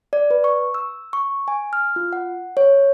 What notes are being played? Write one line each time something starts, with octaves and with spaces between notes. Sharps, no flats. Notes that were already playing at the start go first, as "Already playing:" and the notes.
D5
B4
C#6
E6
C#6
G#5
F6
F4
F#5
C#5